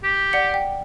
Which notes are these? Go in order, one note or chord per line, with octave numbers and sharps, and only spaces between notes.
G4
D5 F#5 C#7
G5